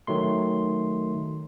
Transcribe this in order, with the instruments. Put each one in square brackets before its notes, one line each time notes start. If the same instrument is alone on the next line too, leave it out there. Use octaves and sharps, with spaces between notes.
[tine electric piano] D#3 F#3 A3 C6